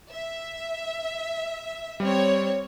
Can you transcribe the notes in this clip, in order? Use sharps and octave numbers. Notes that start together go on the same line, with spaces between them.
E5
G3 C4 C#5